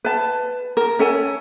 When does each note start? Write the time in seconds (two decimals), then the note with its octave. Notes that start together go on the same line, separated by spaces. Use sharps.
0.04 B4 A5
0.77 A#4
0.99 C#4 A4 G#5